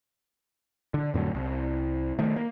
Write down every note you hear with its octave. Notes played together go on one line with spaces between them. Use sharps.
D3
F2 A2 D3 F#3
C2
D#3 A3
A#3